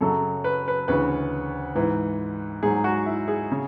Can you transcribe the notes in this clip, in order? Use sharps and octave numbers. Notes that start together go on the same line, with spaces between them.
F#2 C#3 F#3 A4
B4
B4
D2 C#3 E3 B4
G#2 E3
G#2 F#3 G#4
F#4
E4
G#4
C#3